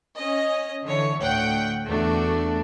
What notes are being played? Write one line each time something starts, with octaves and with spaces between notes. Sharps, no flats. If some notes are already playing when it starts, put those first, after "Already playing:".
C#4 D#5
D3 E3 C#5
D2 A2 F#5 G5 G6
E2 A3 D4 F#4